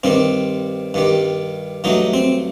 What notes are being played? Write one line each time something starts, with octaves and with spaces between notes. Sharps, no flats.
G2 D#3 G3 C4
G2 D#3 G3
G2 F#3 A3 D#4
C4